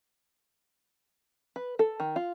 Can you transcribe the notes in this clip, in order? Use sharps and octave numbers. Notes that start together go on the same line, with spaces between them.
B4
A4
D#3
F4